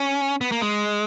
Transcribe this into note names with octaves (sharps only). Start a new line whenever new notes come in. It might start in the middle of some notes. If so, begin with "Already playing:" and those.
Already playing: C#4
B3
A#3
G#3